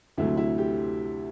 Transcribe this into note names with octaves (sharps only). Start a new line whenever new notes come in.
D2 C3 F#3 A3 E4
E4
G4